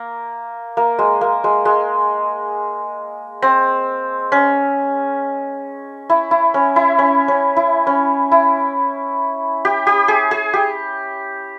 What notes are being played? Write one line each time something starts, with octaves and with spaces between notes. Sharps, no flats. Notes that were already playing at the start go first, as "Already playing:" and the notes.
Already playing: A#3
A#3
G#3
A#3
G#3
G#3
C4
C#4
E4
E4
C#4
E4
C#4
C#4
E4
C#4
E4
G4
G4
G#4
G#4
G4